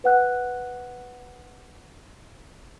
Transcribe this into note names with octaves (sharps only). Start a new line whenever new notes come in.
B4 F#5 F#6